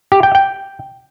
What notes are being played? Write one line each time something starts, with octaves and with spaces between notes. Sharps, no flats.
G4
G5
G5